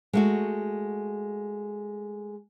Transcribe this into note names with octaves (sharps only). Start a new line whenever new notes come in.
G#3 A3 F#4